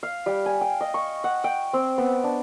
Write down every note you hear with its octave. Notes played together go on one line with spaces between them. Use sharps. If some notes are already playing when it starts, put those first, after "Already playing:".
F5
G3
G#5
G5
D#5
C#6
F#5
G5
C4
B3
D4